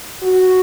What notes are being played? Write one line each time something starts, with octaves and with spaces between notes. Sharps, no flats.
F#4